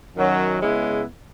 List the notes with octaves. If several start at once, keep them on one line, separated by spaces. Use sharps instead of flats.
F#2 D#3 F#3 C#4
C#3 G#3 B3 E4